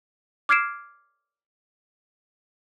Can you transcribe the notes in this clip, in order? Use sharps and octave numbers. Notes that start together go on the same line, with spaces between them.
D6 F6 G#6 C7 D7 E7